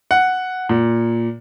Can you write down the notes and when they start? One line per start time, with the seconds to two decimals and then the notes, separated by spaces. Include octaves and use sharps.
0.11 F#5
0.69 A#2